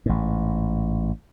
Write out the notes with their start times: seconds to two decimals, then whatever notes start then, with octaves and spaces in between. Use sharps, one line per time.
0.06 A1 G#2